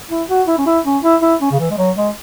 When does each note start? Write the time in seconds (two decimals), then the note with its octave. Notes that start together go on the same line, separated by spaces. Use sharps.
0.10 E4
0.29 F#4
0.47 E4
0.58 C#4
0.66 E4
0.85 C#4
1.03 E4
1.22 E4
1.41 C#4
1.51 C#3
1.60 E3
1.71 G#3
1.78 F#3
1.97 G#3